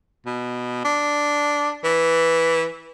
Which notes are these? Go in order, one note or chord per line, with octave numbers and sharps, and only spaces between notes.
B2
D4
E3